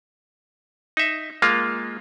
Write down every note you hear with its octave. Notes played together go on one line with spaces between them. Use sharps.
D#4 E5
G#3 A#3 F4